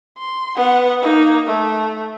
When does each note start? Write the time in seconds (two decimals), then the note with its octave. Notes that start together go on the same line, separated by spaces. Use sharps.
0.18 C6
0.56 B3 F#5
1.02 A#3 D#4
1.47 A3